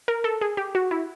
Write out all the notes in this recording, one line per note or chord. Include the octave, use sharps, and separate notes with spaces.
A#4
A4
G#4
G4
F#4
E4